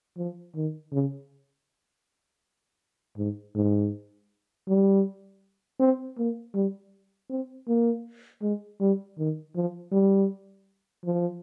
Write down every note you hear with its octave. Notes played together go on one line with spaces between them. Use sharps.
F3
D#3
C#3
G#2
G#2
G3
C4
A#3
G3
C4
A#3
G#3
G3
D#3
F3
G3
F3